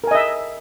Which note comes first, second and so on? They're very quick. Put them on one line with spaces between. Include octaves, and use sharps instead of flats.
A#4 G#5 D#5 E5